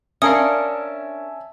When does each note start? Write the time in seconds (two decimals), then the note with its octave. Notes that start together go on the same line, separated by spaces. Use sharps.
0.22 C#4 D4 A#4 E5 F5 G#5 A5 D#6